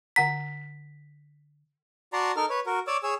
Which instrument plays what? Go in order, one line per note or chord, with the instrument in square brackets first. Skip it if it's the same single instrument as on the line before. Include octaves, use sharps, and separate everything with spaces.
[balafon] D3 F#5 A#5 [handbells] B6
[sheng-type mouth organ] F#4 D5 A5 A#5 C6
D#4 A4 A#4 F6
B4 C#5
F#4 A#4
C#5 D5 D6 E6
G#4 C#5 E6